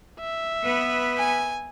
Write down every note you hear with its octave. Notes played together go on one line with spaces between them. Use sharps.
E5
B3 B4
G#5